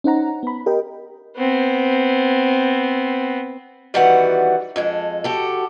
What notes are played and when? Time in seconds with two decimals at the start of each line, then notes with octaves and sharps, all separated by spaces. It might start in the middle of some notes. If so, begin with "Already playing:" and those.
0.04 C#4 D#4 C5 F#5 A#5
0.43 B3 B5
0.66 G4 A#4 D#5 G5
1.37 B3 C4
3.94 D#3 E3 G3 B3 F#4 F#5
4.76 F2 G#3 A4
5.24 F#4 G4 A4